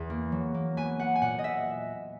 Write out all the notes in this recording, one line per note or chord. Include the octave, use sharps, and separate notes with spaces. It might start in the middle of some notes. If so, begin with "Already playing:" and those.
Already playing: E2
A#3
F#3
A#3
B3 G#5
B3 F#5
G#5
A#2 F#5
D#5
E5